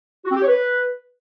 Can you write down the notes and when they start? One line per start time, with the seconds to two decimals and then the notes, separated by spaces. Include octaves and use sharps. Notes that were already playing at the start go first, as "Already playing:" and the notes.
0.25 F#4
0.31 C4
0.36 G4
0.42 C#5
0.48 B4